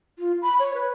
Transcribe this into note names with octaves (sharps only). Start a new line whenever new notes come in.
F4
B5
C#5
B4